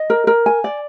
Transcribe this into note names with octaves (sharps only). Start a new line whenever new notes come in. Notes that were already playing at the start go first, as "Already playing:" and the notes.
Already playing: D#5
A#4
A#4
G#5
D5